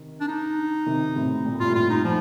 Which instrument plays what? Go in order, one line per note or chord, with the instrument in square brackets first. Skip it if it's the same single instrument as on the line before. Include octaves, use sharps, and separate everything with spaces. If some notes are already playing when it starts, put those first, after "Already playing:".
Already playing: [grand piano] C3 D#3
[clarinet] D4
D#4
[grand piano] C3 D#3
A2 C3
A#2
A2
[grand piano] G2 [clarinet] F4
[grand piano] A2 [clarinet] F4
[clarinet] D#4
F3